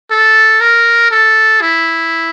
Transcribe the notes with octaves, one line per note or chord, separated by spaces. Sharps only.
A4
A#4
A4
E4